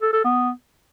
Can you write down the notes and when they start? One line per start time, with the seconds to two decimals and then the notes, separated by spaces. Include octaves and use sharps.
0.02 A4
0.13 A4
0.24 B3